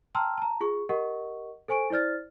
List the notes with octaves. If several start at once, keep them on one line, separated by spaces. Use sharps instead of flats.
G5 A5 A#5 C6 E6 F6
A5 A#5
F4 G#4 C#6
G4 A#4 D#5 F#5 C#6
A4 C5 G#5 C#6 D7
E4 C5 D5 F6 A6